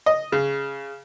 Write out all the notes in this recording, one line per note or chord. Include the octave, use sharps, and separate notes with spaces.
D#5
C#3